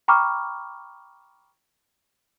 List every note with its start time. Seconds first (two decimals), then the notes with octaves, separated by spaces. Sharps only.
0.08 G5 A#5 B5 C#6 D6 F6